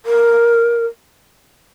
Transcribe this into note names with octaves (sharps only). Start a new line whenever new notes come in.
A#4